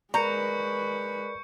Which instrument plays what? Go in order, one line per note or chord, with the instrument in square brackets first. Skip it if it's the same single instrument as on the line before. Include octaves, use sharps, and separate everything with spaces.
[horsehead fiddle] G#3 B4 [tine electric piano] A#4 D5 [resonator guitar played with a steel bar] A#5 [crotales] C#6 G6 C#7